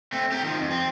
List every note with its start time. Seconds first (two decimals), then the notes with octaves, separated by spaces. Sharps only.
0.12 A3 C4
0.32 G4 A#4
0.44 D#3 F3
0.59 F2
0.71 C4